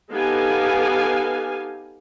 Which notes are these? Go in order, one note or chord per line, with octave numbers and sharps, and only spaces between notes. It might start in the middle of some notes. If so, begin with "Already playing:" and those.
B3 D#4 G4 A4 F5 G#5